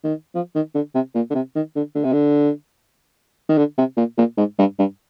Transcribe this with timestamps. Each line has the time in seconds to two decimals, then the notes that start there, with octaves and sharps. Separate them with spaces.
0.04 D#3
0.35 F3
0.55 D#3
0.75 D3
0.95 C3
1.15 A#2
1.30 D3
1.35 C3
1.55 D#3
1.76 D3
1.95 D3
2.04 C3
2.13 D3
3.49 D#3
3.58 D3
3.78 C3
3.97 A#2
4.18 A#2
4.37 G#2
4.59 G2
4.79 G2